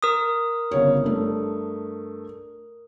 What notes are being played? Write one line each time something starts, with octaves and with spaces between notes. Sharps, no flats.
A#4 D#6
G1 C#3 C#5
G2 A3